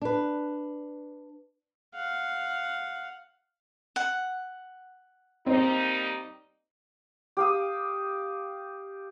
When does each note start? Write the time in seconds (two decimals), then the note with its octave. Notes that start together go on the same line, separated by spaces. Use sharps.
0.02 D4 B4
1.95 F5 F#5
3.96 F#5
5.46 G3 A#3 C4 D#4
7.37 G4 F5 D#6